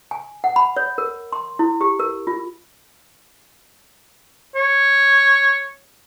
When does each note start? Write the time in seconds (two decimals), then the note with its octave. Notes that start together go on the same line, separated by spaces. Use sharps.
0.11 G#5
0.44 F#5
0.56 B5
0.77 C#5
0.98 A#4
1.33 C6
1.59 E4
1.81 G4
1.99 A#4
2.27 F4
4.55 C#5